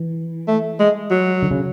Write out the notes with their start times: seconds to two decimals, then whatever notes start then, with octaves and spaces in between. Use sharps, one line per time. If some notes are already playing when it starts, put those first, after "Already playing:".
Already playing: E3
0.48 A3
0.80 G#3
1.10 F#3
1.42 D3
1.51 C#3